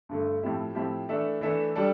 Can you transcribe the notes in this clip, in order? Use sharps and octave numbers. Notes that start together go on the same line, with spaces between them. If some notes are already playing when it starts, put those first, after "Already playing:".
G2 D3 A3
A2 F3 C4 E4 G4
A2 F3 C4 E4 G4
E3 A3 D4 A4 E5
E3 A3 D4 A4 E5
G3 D4 A4 D5